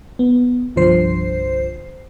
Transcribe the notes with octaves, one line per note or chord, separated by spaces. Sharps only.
B3
C2 G2 D3 F3 C5 C7